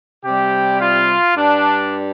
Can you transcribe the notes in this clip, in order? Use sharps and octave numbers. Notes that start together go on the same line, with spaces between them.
C3 G3 G4
F4
G2 G3 D4